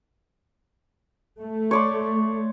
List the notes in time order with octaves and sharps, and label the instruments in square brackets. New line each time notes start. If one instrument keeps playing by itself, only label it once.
[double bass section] A3
[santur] C#5 D5 C6